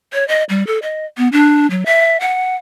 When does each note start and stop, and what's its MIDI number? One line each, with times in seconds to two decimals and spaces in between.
0.13 0.27 73
0.28 0.44 75
0.49 0.65 55
0.67 0.79 69
0.82 1.06 75
1.17 1.28 59
1.32 1.69 62
1.70 1.84 54
1.86 2.17 76
2.20 2.56 78